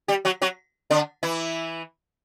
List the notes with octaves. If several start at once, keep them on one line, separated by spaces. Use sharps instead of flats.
G3 G4
F#3 F#4
F#3 F#4
D3 D4
E3 E4